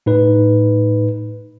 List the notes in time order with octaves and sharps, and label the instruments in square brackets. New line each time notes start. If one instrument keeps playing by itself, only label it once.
[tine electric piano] A2 D#4 B4